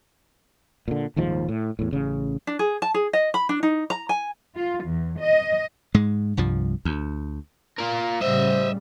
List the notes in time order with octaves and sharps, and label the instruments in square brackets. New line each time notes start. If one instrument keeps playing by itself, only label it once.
[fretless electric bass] A#2 D3
D#1 D#2 G#2 F3
A2
E2 A2
A1 C#3
[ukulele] D4
G#4
A5
G#4
D#5
B5
D4
D#4
A#5
G#5
[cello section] F4
E2
D#5
[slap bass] G#2 G#3
C2 G2 F3
D2
[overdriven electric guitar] F4 A#4
[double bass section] A2 C#3 G3 [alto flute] C5 [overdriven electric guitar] D#5 E5